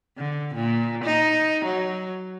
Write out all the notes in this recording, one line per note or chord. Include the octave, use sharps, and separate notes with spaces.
D3
A#2
D#4
F#3